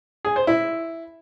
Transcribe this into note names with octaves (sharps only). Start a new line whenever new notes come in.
G#4
C5
E4